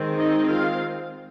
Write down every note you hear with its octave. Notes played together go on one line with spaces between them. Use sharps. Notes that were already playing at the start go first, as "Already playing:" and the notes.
Already playing: D#3 G#3 C4
D#4 D#5
F4 F5